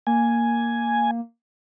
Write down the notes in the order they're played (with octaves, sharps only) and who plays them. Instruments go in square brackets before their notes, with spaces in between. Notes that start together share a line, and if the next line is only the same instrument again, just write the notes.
[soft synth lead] A#3 [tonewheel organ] G#5